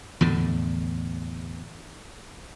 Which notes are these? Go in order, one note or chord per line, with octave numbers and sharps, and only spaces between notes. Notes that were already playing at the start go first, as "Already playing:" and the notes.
E2 A2 D3